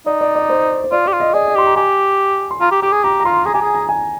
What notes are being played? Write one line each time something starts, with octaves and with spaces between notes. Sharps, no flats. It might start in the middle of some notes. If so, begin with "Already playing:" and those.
D#4 D5
D5
D5
C5
C5
F4 D5
G4 D5
F4
D#5
G#4 D5
D#5
G4 C6
A#5
G4 G#5
C6
F4 A#5
G4
G4 D6
G#4
G4 A#5
A#5
F4 C6
G#4 A#5
G4 G#5
G#4 A#5
A#5
G#5